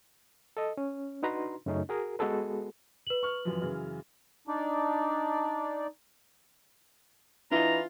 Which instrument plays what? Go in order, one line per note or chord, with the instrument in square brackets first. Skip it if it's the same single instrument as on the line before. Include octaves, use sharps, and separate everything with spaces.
[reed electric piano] A4 D#5
C#4
D4 D#4 F#4 B4 A#5 C6
F#2 C#3 A3 C#4 D#4
F#4 G#4 A#4
G#3 B3 F#4 G#4 A4 B4
[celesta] B4 F#7
[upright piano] C#6 F6
F#2 E3 F3
F#2 C#3 E3
[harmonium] D4 D#4 D5
[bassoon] E3 [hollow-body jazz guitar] D4 E4 D#5 [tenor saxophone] F4 [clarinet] A#5